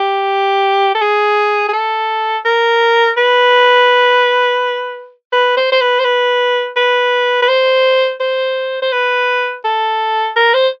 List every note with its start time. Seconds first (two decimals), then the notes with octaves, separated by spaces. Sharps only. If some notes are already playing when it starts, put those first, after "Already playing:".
Already playing: G4
0.95 A4
1.01 G#4
1.69 G#4
1.73 A4
2.45 A#4
3.17 B4
5.33 B4
5.57 C5
5.72 C5
5.81 B4
6.00 C5
6.05 B4
6.77 B4
7.42 B4
7.49 C5
8.21 C5
8.82 C5
8.92 B4
9.65 A4
10.36 A#4
10.54 C5